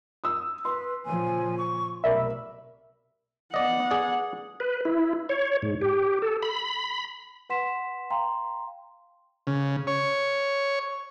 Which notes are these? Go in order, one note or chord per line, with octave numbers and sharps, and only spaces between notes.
D#6 E6
B4 C6
A#2 C#3 F3 G#5
C#6
F1 B1 A#4 D5 E5 B5
B3 D5 D#5 F#5
G#4 D5
B4
E4
C#5
G#2
G4
A4
B5
B4 F#5 C6 B6 E7
F5 G5 A#5 C6
C#3
C#5